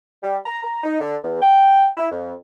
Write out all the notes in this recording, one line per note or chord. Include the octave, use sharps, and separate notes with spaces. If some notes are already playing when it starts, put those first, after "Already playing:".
G3
A#5
A#5
D#4
D3
E2
G5
E4
F2